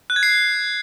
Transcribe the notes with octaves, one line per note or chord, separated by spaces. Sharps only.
F#6
G#6
C7